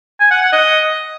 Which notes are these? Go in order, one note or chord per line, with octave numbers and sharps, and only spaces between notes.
G#5
F#5
F#5
D#5